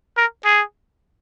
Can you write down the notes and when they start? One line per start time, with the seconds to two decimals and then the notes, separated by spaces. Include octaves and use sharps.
0.17 A#4
0.45 G#4